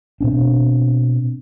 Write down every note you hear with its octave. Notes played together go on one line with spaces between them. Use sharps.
B2 C4 D4